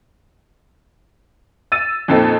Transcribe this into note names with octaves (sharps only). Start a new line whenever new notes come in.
E6 A6 D#7
F2 A#2 C4 D#4 A4